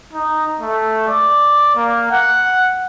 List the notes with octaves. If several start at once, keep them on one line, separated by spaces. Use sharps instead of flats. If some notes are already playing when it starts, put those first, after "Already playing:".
D#4
A3
D5
A#3
F#5